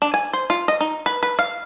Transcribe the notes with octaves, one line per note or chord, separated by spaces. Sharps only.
D4
G#5
C5
F4
D#5
D#4
B4
B4
F5